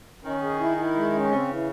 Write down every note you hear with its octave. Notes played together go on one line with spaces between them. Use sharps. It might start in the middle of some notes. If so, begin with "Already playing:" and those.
D#3 C#4
G#4
E4
E4
G#3
C#4
C#3 C4
E3